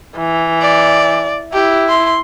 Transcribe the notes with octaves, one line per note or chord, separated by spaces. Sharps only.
E3
D5
E4 G4
C6